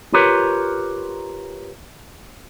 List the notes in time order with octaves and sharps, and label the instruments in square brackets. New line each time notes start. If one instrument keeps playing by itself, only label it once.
[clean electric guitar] F4 G4 A#4 B4 C#5